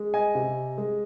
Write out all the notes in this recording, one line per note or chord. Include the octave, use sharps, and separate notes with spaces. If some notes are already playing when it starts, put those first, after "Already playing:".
Already playing: G#3
D#5 G#5
C3
G#3